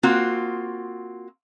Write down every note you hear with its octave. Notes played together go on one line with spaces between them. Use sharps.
A#3 C4 F4 F#4